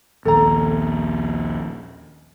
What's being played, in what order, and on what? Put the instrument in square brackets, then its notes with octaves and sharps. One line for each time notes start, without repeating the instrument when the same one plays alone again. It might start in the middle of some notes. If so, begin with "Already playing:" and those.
[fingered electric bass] A#1 D#2 [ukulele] A4 A#5